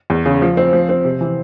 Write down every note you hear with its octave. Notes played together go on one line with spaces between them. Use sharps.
E2
C#3
F3
C4
F3
C4
C3
E3